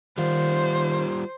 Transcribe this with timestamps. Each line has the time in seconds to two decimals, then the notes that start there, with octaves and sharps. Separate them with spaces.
0.18 D#3 G3 F4 C5